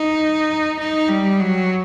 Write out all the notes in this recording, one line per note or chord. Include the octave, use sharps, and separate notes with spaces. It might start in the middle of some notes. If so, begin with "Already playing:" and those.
Already playing: D#4
D#4
G3
F#3